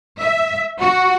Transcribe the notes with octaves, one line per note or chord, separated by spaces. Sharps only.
E5
F#4